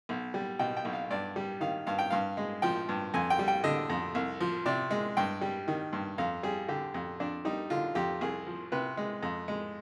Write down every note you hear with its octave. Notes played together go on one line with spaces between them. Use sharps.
B1
G3
B2 G5
G5
B1
F5
G2 D5
G3
D#3 F5
G2 F5
G5
G2 F5
G#3
F3 G5
G2
F2 G#5
G5
G3
G5
D3 D#5
F2
C2
F3
C3 D5
G#3
G2 G5
G3
D#3
G2
F2 F5
G3 G#4
D3 G4
F2
F2 D4
G3 D#4
D3 F4
F2 G4
C2 G#4
F3
C3 B4
G#3
F2
G#3